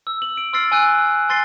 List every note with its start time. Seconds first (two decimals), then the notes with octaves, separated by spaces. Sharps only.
0.07 E6
0.22 F#7
0.37 D7
0.53 C6 E6 F6 A6 C7 D7
0.72 G#5 E6 F#6 D#7
1.29 G#5 C6 A6 C7 G7